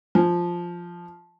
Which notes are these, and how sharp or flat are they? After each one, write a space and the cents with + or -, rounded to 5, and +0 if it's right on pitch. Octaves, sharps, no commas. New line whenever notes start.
F3 +0 G#5 +0